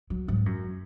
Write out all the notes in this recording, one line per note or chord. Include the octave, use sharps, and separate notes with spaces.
F#3
G#2
F#2